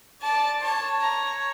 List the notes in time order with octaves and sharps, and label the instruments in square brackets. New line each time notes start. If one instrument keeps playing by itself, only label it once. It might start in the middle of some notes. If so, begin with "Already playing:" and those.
[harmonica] D5 [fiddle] A5
[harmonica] C#5 [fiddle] A5
[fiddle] A#5